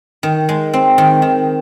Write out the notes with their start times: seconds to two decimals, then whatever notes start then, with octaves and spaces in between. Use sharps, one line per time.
0.23 D#3
0.49 G#3
0.74 C4
0.98 D#3
1.22 D#3